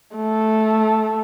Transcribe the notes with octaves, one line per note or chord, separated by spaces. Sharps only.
A3